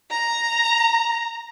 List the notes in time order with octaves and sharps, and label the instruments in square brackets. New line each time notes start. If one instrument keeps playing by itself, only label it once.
[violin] A#5